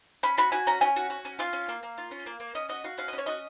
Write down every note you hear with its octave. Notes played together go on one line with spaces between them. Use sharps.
C#4 B5
F#4 B5
F#4 G#5
C#4 A#5
C#4 G#5
F#4
F#4
C#4
F4 F5
C#4
A#3
A#3
F4
C#4
A#3
A#3
C#4 D#5
F#4 D#5
F#4 F5
C#4 F5
D#5
C#4
C#5
F#4 D#5